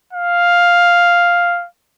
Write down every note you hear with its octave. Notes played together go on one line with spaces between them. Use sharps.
F5